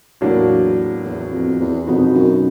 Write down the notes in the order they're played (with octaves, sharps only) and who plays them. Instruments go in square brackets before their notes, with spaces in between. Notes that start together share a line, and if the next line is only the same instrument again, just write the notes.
[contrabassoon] E2 [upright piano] A2 F#3 A#3 D4 F#4
[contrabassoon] E2
F2
E2
[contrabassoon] F2 [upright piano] B2 F#3 B3 D#4 F#4
[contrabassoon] F#2